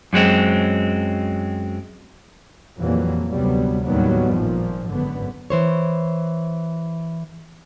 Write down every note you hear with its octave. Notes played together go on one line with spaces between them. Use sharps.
F#2 F#3 G#3 C4
F2 A#2 E3 F#3 G3 A#3
D2 C3 F#3 G3 B3
D#2 A2 D#3 F#3 G3 B3
G#1 A#2 F3
G#1 F#2 D3 B3
E3 C5 C#5